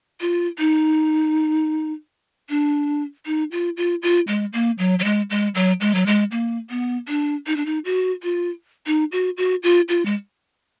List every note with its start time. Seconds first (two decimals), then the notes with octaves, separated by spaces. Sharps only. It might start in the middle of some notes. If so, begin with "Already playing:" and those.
0.21 F4
0.59 D#4
2.50 D4
3.26 D#4
3.52 F4
3.77 F4
4.02 F4
4.28 G#3
4.53 A#3
4.78 F#3
4.99 F#3
5.04 G#3
5.30 G#3
5.55 F#3
5.81 G#3
5.95 F#3
6.06 G#3
6.32 A#3
6.70 B3
7.08 D4
7.47 D#4
7.57 D4
7.66 D#4
7.85 F#4
8.23 F4
8.87 D#4
9.12 F#4
9.37 F#4
9.63 F4
9.89 F4
10.06 G#3